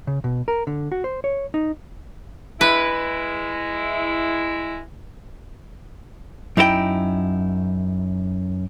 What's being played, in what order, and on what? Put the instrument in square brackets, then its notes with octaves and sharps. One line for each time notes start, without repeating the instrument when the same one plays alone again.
[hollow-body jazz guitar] C#3
B2
A#4
D3
F#4
C5
C#5
D#4
[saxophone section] G#3 E4 [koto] B4
[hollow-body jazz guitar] F#2 D#4 E4 F#4 G5